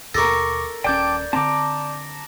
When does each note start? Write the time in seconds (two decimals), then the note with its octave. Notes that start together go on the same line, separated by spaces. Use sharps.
0.14 D#2 B2 A4 A#4 C#6 D6 A#6
0.84 D#1 C#4 D5 G5 A5 D6 G6 G#6
1.33 D3 C4 A5 A#5 D6